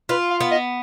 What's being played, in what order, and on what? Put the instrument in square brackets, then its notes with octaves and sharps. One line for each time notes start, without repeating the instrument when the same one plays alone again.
[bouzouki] F4 [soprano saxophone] B4
[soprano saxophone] F5
[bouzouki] B3
[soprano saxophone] D#5